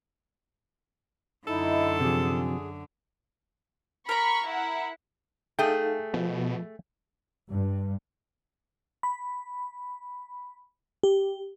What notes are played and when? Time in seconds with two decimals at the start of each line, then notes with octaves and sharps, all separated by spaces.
1.47 F#2 D3 D#4 E4 A4
2.00 C3 F3 G#4
4.09 A#4 A#5 B5 C#6
4.45 E4 F#5
5.59 A3 D#4 G#4 A4 F5 G5
6.14 B2 F3
7.50 G2
9.03 B5
11.03 G4